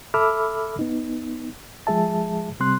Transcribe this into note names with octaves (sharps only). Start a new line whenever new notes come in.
A4 E5 B5 D6 E6 F6
B3 D#4
F3 G#3 G#4 E5 A5
C3 G3 C4 C6 F#6